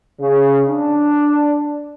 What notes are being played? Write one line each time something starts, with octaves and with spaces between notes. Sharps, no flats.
C#3
D4